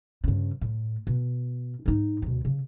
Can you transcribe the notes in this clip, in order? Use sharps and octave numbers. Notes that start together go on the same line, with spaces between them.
G2 C#3
A2
B2
G#2 D#4
D2 B2
C#3